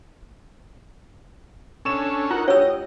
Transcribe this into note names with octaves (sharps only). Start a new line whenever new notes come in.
C#4 D4 A4 C#6 E7
D#4 F4 F#4 A#4 F#5
F#4 G4 C#5 D#5 E6